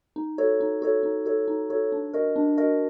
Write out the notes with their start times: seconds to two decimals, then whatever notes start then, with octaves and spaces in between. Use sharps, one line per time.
0.16 D#4
0.38 F#4 A4 C#5
0.60 D#4
0.82 F#4 A4 C#5
1.03 D#4
1.25 F#4 A4 C#5
1.48 D#4
1.70 F#4 A4 C#5
1.92 D4
2.14 F#4 A#4 D#5
2.36 D4
2.58 F#4 A#4 D#5